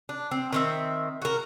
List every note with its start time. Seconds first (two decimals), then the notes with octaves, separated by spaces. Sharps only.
0.09 D4
0.31 C4
0.53 D#3 C4 E5
1.22 F#4 A#4